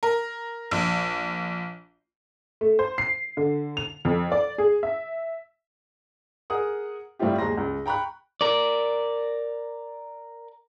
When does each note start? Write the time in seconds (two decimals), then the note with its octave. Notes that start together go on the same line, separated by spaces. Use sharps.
0.03 A#4
0.71 A#1
2.61 A3
2.79 C5
2.98 C7
3.37 D3
3.77 F7
4.05 F2
4.32 D5
4.58 G#4
4.83 E5
6.50 G#4 A#4 F#5 D#6
7.19 A2 G3 C4 E4 F4 G4
7.38 D#2 G#3 A#5 C6 A#6
7.57 C#2
7.86 G5 A#5 B5 C#6 F#6
8.41 A#4 D5